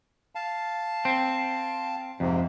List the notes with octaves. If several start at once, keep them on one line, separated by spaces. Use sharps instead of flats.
F5 A5
C4
F2 G#2 C3